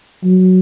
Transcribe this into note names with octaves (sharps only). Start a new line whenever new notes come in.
F#3